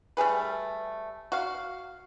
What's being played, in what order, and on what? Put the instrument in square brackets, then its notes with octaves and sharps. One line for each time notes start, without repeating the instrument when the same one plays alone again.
[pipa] G3 A3 G#4 B4
F#4 F5